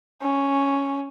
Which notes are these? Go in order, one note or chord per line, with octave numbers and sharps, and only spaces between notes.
C#4